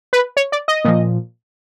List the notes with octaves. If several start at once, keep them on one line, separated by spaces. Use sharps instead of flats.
B4
C#5
D5
D#5
A#2 F3